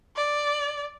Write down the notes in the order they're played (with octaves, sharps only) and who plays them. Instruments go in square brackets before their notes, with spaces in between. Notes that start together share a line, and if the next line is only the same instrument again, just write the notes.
[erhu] D5